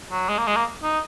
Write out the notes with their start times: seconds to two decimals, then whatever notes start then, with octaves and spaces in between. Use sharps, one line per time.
0.11 F#3
0.29 G#3
0.38 A#3
0.47 G#3
0.56 A#3
0.83 D#4